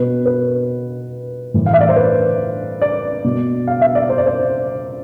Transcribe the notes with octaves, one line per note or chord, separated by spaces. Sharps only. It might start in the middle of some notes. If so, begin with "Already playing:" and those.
Already playing: B2 B4
B4
A2 E3
F5
E5
D5
C5
B4
D5
B2
F5
E5
D5
C5
D5
C5